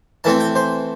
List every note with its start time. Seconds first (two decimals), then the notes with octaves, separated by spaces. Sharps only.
0.24 E3 A3 C4 A5
0.40 G5
0.56 C5